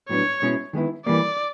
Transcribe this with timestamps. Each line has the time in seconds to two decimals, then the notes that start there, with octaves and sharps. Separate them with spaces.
0.09 A2 F#3 B3 D4 C#5
0.42 B2 G#3 C#4 E4
0.73 D#3 G#3 B3 E4
1.06 E3 G3 A#3 D5